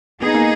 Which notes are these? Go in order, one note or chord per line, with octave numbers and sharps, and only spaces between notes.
B3 D#4 G#4
A#3